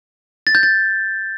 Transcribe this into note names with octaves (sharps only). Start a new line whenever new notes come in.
A6
G6
A6